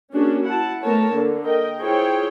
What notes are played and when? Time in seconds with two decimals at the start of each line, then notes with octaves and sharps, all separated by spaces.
0.13 A#3 C#4 D4 F#4 G#4
0.46 E4 F#5 A5
0.83 A3 B3 A#4 C#5 A5
1.11 D3 A#3
1.44 A#4 D#5 G5
1.80 E4 F4 G#4 C5 C#5 G5